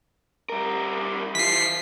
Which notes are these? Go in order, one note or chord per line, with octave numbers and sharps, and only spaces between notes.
G3 A#4
E3 F4 B6 C7